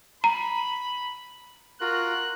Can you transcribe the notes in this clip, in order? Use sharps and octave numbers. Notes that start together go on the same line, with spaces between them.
A#5 B5
F4 F#4 A#4 F#6